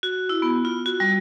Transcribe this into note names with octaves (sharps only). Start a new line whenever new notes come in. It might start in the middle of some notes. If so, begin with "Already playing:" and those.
F#4
E4
B3
F4
F#4
G3